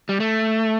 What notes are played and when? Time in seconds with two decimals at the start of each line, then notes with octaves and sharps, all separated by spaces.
0.09 G3
0.20 A3